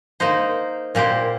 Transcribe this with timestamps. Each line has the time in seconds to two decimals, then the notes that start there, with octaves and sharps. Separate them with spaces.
0.20 A#3 D#4 C5
0.95 A#2 A#3 G4 C5